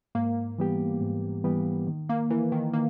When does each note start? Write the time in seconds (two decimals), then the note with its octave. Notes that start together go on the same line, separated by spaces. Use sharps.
0.15 G#2 A#3
0.58 E3 G3 B3 G4
1.01 G#2
1.44 E3 G3 B3 G4
1.87 D#3
2.09 A#3
2.30 E3 A#3 E4 A#4
2.52 D#3
2.74 D#3 A#3